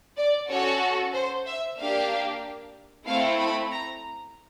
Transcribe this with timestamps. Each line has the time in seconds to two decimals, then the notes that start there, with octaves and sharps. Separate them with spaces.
0.17 D5
0.49 C#4 F#4 A4 C#5
1.13 C5
1.46 E5
1.78 A#3 D4 G4 F5
3.06 A3 C4 E4 F5
3.39 B5
3.71 A#5